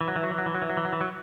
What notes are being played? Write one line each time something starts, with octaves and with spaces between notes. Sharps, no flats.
E3
F#3
E3
F#3
E3
F#3
E3
F#3
E3
F#3
E3
F#3
E3
F#3